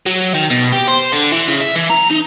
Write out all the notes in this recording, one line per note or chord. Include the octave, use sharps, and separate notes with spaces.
F#3
D#3
B2
G4
C5
D3
E3
C#3
E5
E3
A#5
D#4